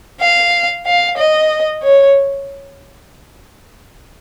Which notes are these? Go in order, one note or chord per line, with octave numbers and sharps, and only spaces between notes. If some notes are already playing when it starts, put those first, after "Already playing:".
F5
F5
D#5
C#5